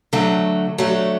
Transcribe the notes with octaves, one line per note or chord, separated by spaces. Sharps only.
D3 F#3 A3
D3 F#3 A3